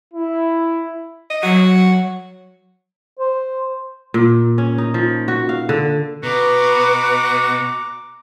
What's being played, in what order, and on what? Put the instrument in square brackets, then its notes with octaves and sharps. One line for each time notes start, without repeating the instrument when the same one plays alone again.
[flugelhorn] E4
[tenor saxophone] D#5
[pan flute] F#3 [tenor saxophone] F#4
[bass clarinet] C5
[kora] A#2
C#4
D#4
F3
F#4
F5
D3
[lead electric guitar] B2 [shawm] F#4 [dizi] B4 [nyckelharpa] A#5 D6